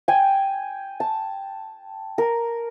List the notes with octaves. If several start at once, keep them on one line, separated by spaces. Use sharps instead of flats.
G5 G#5
A5
A#4